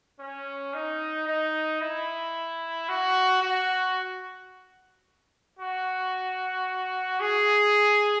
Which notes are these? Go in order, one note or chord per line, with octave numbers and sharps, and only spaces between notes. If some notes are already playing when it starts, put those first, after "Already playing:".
C#4
D#4
D#4
E4
F#4
F#4
F#4
G#4